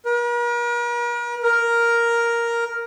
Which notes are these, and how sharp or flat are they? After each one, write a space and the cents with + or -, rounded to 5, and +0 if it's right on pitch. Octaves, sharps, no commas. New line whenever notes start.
A#4 +45
A#4 +5